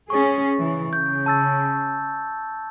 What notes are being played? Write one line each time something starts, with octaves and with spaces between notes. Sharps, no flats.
C#4 G#4 C#6 A6
C#3 E3
C#3 G6
A5 E6 A6